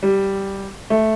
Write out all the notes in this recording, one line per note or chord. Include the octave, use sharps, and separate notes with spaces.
G3
A3